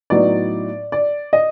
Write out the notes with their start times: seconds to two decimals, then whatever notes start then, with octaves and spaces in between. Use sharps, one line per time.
0.10 A2 F#3 B3 D#4 D5
0.92 D5
1.33 D#5